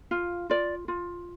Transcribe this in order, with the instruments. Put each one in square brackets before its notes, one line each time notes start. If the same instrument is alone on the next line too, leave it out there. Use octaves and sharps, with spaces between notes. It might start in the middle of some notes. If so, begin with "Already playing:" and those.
[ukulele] F4
F4 D5
F4